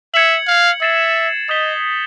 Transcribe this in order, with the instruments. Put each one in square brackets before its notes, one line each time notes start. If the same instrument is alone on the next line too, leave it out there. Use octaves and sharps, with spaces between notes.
[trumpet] E5 [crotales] G#6 C#7 F#7
[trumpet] F5
[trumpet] E5 [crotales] A6 C7 E7
[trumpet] D#5 [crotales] D#6 G6 B6 E7 G7